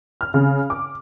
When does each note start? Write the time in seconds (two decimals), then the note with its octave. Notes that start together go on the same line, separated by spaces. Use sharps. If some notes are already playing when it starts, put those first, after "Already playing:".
0.21 F6
0.34 C#3
0.70 D6